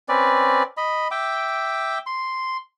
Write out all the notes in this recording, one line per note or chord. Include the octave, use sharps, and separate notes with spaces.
C4 C#4 B4 D5
D#5 B5
E5 G5 D6
C6